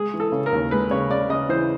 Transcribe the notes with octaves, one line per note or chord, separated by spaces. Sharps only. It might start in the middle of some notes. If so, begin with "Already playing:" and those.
Already playing: G#3 G#4
E3
A4
C#3
A#4
D#2
G#3 B4
C#3 C#5
C#3 D5
C#3 D#5
E3 C5